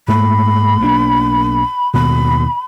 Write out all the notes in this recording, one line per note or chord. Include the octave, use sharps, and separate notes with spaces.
G#2 A3 A#3 B5
B1 A#3 D4
D#2 B2 B5